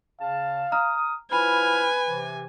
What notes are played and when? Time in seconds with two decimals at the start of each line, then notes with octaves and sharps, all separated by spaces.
0.21 C#3 F5 A5
0.72 A#5 D#6 F6
1.32 F3 E4 B4 G#5 B5 F6
2.08 C3 E3